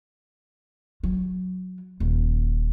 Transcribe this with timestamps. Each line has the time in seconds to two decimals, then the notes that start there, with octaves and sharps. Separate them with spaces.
1.03 F#3
2.00 D#1